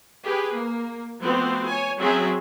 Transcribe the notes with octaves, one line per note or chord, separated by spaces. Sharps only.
G4 G#4 B4
A#3
F3 A3 B3 C4 F#4
C#5 G#5
F#3 C4 C#4 G#4 E5